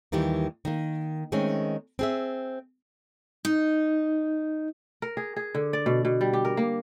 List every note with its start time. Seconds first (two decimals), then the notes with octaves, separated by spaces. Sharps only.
0.12 D#2 D#3 E3 G3 G4
0.65 D#3 A#3
1.32 D#3 G#3 A3 C4 C#4
1.99 C4 G#4 E5
3.45 D#4
5.02 A#4
5.17 G#4
5.36 G#4
5.55 D3
5.73 D5
5.86 B2
6.05 B2
6.21 G3
6.33 G4
6.45 A#4
6.57 A#3